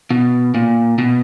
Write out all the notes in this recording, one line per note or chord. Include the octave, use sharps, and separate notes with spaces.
B2
A#2
B2